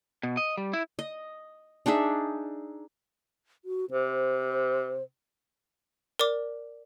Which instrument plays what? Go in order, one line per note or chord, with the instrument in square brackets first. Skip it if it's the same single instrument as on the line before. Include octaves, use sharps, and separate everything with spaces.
[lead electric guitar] B2
D#5
G3
E4
[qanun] D#5
D4 D#4 G#4 E5
[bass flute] F#4
[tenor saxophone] C3 [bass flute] C5
[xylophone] A#4 D5 D6